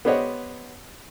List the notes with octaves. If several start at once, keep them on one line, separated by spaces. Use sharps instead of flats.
B3 G4 C5 C#5 D#5 F#5